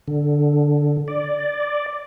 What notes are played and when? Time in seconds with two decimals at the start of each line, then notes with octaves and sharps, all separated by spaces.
0.08 D3
1.08 D5